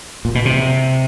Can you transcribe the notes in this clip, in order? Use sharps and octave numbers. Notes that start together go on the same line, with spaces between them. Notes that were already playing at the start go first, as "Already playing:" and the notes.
A#2
B2
C3